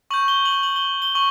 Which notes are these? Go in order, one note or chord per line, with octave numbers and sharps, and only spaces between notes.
C#6 G6 F#7
G7
F#7
F#7
G7
G7
C#6 F#7